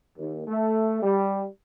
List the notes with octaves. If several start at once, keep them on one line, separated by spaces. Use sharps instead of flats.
D#2
A3
G3